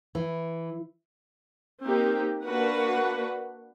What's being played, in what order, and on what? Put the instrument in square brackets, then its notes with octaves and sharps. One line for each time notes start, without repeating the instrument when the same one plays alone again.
[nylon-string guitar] E3
[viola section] A#3 C4 D#4 G4
A#3 D4 F#4 B4 F#5